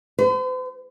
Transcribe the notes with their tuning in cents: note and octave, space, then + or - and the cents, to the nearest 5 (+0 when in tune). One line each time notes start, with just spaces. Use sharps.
C5 -45